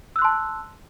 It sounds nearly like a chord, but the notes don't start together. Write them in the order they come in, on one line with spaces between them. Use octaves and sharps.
E6 F#6 C6 A5